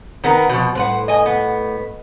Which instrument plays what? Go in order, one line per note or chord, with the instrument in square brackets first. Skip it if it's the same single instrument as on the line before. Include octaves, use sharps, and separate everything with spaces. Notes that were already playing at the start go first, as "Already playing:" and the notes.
[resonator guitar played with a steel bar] D#3 B3 A#4
B2 F3
[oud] A2 B4 [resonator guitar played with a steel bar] C5 F#5
[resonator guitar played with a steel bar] D#5 G#5
B3